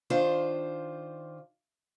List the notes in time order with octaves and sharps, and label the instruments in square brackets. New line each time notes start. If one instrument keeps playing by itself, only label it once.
[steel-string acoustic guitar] D#3 D4 F4 C5